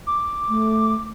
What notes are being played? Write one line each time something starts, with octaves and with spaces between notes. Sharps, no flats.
D6
A3